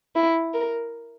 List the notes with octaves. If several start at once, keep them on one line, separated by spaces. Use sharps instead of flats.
E4
A#4